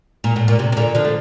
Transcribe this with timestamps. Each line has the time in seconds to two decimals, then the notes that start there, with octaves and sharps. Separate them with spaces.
0.24 A#2
0.36 A2
0.48 A#2
0.59 C3
0.72 C3
0.77 A#2 D3
0.95 D3 F3
1.05 A3